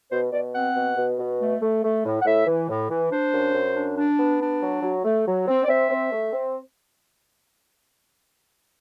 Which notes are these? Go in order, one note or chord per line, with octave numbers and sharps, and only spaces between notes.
B2 C5
B2 D5
C4 F#5
B2
B2
B2
A3
A3
A3
A2
F#5
A2 E5
E3
A2
E3
D4 C5
F#2
F#2
D4
D4
B3
D4
F#3
F#3
A3
F#3
C4
D5
C4 E5
C4
A3
C4